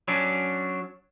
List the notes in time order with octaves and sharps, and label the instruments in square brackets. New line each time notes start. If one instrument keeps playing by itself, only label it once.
[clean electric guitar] F#3 C#4 D4